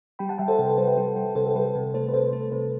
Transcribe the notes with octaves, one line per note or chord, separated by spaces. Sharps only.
G3 G5 B5
F#5 A5
G3 E5 G5
A4 C5
C3 A4
B4
G3 A4 C5
B4
G3
G3
C3 A4 C5
A4
G3 B4
A4
C3
A3 A4 C5
B4
C3 A4 C5
A3
C3 B4